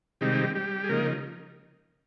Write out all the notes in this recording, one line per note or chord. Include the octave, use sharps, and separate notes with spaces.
C3 D#3 G3 G#3 C4 D#4 G4
G3 G4
G#4
C#3 F3 G#3 A#3 D#4 A#4